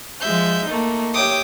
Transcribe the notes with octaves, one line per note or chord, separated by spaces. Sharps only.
F3 G#3 E5 G6
A3 A#3 D#4
G4 C#5 E5 G5 D6 D#6